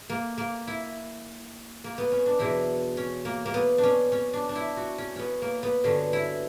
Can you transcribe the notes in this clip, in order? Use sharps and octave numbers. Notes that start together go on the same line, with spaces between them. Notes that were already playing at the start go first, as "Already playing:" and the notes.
Already playing: C#3
A#3
A#3
E4
A#3
B3
C#4
D4
E2 B2 F#3 E4
C#4
A#3
A#3
B3
D4
C#4
C#4
D4
D4
E4
F#4
C#4
B3 C#4
A#3
B3
G2 D3 F#3 C#4
E4